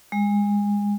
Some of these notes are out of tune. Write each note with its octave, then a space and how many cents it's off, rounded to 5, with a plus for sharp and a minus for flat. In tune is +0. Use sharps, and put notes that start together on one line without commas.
G#3 -25